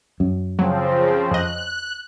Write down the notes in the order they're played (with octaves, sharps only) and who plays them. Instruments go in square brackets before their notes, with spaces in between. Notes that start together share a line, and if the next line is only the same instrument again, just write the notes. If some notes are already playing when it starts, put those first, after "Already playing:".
[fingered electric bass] F#2
[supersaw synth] C#3 F3 C4 [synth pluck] F#3
[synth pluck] F2 D#5 [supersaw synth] F#6